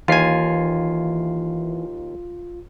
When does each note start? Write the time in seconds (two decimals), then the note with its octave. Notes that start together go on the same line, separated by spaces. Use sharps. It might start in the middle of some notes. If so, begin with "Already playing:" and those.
0.08 D#2 E3 F4 G#5 C7